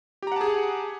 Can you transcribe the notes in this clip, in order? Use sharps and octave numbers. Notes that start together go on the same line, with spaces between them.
G4 G#4 F#5 A5 A#5